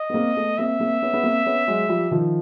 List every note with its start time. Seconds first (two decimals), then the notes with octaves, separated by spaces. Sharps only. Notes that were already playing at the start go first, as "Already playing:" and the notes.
Already playing: D#5
0.10 B3
0.14 A#3 C4
0.36 A3 B3
0.58 A#3 C4 E5
0.80 A#3 C4
1.02 B3 C#4
1.14 B3
1.23 A#3 C4
1.46 B3 C#4
1.67 F#3 G#3
1.89 F3 G3
2.11 D#3 F3